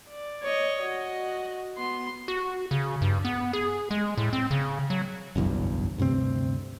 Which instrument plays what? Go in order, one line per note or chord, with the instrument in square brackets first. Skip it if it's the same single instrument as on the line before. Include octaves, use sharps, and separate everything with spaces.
[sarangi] D5
[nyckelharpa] C#5 D#5
[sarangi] F#4 [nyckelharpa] D#5
[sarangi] B3 [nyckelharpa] C6
[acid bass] F#4
C#3
G2
B3
G#4
G#3
A2
C4
C#3
F#3
[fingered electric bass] F#1 B1 E2 G2
D2 G2 C3 C4